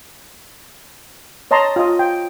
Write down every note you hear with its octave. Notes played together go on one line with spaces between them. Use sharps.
C#5 D#5 A5 A#5 C6
F4 D#5
G5